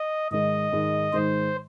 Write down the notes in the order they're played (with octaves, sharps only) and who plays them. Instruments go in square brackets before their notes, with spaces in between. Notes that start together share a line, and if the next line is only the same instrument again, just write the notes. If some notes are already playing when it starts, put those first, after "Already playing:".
Already playing: [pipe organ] D#5
[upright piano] G#2 D#3 G#3 [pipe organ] D#5
[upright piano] G#2 D#3 G#3
[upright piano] G#2 D#3 G#3 [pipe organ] C5